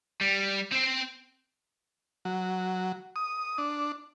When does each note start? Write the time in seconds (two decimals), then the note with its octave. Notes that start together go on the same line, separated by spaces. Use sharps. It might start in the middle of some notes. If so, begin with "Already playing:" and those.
0.21 G3
0.72 C4 C5
2.25 F#3
3.16 D#6
3.58 D4